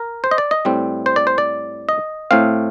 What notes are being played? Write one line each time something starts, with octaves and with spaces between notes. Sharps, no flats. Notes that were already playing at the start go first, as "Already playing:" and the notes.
Already playing: A#4
C5
D#5
D5
D#5
A2 G3 C4
C5
D5
C5
D5
D#5
A2 A3 C4 F5